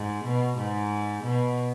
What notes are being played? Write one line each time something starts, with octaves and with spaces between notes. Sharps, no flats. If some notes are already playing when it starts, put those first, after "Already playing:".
Already playing: G#2
B2
G#2
B2